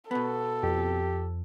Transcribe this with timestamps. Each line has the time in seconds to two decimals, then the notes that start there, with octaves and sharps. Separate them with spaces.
0.11 B2 B3 A4
0.63 F2 G4